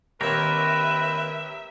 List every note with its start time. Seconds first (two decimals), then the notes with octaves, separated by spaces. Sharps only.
0.21 D#2 C4 G4 A#4 B4 C#5 E5